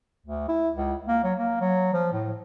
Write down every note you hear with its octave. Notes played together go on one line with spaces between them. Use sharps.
D2
E4
C#2
A#3
F#3
A#3
F#3
F3
A2